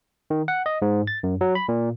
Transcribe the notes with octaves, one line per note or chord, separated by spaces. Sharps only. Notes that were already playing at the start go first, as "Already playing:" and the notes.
D#3
F#5
D#5
G#2
A6
F#2
F#3
B5
A#2